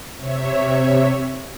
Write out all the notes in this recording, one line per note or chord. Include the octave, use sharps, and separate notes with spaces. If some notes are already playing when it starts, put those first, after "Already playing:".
C3 C#5 E5